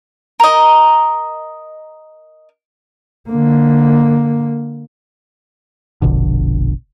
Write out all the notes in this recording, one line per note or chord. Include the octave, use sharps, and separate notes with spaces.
A#4 D#5
D3 A#3
F1 A#1 B2 D3